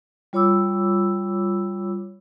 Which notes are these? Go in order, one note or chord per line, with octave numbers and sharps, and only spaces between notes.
G3 F4 C#5 B5 D6 E6